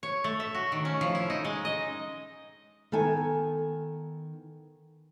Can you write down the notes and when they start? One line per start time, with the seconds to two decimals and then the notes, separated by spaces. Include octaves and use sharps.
0.03 C#5
0.24 A3
0.40 E5
0.55 F#4
0.72 D#3
0.85 C#4
1.01 F3
1.15 E4
1.30 D#4
1.45 G#3
1.65 D#5
2.92 D#3 B3 A4 G#5